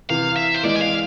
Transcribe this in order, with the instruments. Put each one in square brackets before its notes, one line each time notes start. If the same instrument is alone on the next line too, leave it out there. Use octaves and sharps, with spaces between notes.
[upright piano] C3 E3 [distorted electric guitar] F5
[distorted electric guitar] E5
C5
[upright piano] E3 G#3 [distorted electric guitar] D5
[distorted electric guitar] G#5
F5